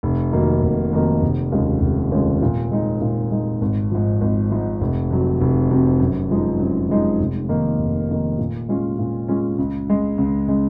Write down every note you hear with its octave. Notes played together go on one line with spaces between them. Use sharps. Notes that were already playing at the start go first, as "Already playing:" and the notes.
F1
F2 D#3 F#3 A#3
F1
F2 D#3 F#3 A#3
F1
D#2 C#3 F3 G#3
F1
D#2 C#3 F3 G#3
A#2
G#3 D#4
A#2
G#3 D#4
G#1
G#2 F3
G#1
G#2 F3
F1
F2 C3 F#3
F1
F2 C3 F#3
F#2
F3 G#3 D#4
F#2
F3 G#3 D#4
F1
F2 D#3 A#3
F1
F2 D#3 A#3
A#2
G#3 C#4 F4
A#2
G#3 C#4 F4
C#2
C#3 G#3
C#2
C#3 G#3